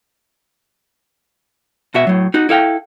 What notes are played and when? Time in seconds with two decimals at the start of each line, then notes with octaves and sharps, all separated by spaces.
1.94 B2 F#4 E5
2.07 A2 F#3
2.34 D#4 F#4
2.49 E4 A4 F5 G5